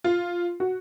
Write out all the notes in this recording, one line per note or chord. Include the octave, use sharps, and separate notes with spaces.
F4
F#4